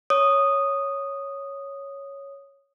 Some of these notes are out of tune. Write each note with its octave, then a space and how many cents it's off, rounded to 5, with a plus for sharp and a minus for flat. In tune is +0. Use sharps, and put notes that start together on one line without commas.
C#5 +0 D#6 -5